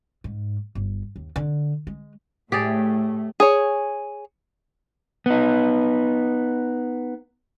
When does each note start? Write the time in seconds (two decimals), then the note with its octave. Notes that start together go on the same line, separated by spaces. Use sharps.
0.24 G#2
0.75 G1
1.16 D#2
1.36 D3
1.87 G#3
2.52 A2 A3 G4 G#4 D5
3.40 G#4 C#5
5.26 B3 D#4